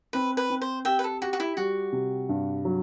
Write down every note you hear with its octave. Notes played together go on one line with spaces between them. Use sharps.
C4 B4
B4
C4
C5
G4 E5 G5
B4
A4
F#4 G4
F#4
E4
G3 F#4
C3
G2
F#3